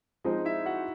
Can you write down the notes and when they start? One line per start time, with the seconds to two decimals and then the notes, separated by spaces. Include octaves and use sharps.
0.24 F3 G#3 C4 D#4 D#5
0.45 E4 E5
0.66 F#4 F#5